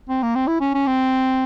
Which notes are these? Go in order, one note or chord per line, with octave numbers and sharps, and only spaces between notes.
C4
A#3
C4
E4
C#4
C#4
C4